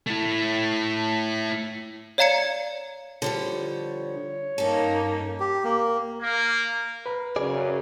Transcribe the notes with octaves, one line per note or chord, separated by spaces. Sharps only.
A3 E4
C#5 D5 F5 A#5 G#6 C#7
D3 F3 G3 C#5
G2 A#3 C#4 D#4 A4
G4
A#3
A#3
B4 A#5
F#2 C#3 G#4 D5